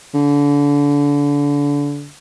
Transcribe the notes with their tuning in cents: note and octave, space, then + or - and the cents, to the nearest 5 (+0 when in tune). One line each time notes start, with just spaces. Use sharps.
D3 -30